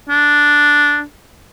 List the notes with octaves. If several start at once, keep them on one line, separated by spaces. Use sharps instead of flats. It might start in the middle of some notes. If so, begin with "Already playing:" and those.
D4